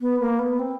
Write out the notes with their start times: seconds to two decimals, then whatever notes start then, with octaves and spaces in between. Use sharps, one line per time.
0.01 B3
0.20 A#3
0.39 B3
0.59 C4